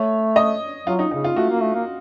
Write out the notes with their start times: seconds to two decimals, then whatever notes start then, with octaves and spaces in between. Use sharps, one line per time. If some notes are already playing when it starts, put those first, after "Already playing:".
Already playing: A3 C#5
0.36 D#5
0.86 F#3 F4
0.99 D#4
1.11 C#3 D#4
1.24 F4
1.36 A3 F#4
1.50 A#3
1.62 A3
1.75 A#3